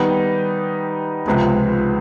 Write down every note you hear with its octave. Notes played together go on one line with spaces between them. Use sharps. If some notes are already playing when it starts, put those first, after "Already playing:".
Already playing: D#3 G3 B3 D#4
C#2 C3 F3 G#3 B3